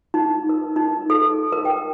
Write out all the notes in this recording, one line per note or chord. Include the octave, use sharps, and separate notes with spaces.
D#4
A#4
D#4
A4
A#4
G5